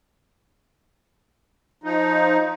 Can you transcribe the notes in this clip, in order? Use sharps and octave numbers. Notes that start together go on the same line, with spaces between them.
F3 D#4